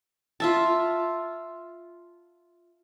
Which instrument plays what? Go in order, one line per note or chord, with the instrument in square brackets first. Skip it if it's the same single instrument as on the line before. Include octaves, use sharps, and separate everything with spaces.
[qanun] F4 E5 A5